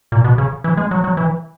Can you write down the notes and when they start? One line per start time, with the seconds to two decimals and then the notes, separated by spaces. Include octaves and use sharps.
0.12 A#2
0.24 B2
0.38 C#3
0.64 E3
0.77 G#3
0.91 F#3
1.04 F#3
1.17 E3